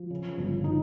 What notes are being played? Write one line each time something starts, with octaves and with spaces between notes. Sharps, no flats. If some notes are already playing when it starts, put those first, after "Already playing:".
Already playing: F3
C#3
G1
D#4